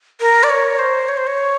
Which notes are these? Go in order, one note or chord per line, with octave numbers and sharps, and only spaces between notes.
A#4
D5
C#5
C5
C#5
C5
C#5